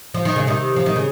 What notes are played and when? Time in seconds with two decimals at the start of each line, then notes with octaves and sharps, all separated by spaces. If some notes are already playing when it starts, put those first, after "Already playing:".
0.14 F3
0.25 D#3
0.36 C#3
0.47 C3 D#3
0.76 F3
0.86 D#3
0.96 C#3